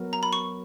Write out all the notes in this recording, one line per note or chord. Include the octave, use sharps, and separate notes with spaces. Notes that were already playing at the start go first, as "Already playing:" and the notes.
Already playing: F#3 B3 F#4 A#4
A#5
B5
C#6